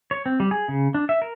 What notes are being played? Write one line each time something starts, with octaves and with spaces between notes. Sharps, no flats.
C#5
C4
G3
G#4
C#3
D4
E5
A#4